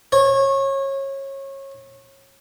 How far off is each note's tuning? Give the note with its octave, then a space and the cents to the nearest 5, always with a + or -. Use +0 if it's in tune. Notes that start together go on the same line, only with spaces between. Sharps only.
C#5 -25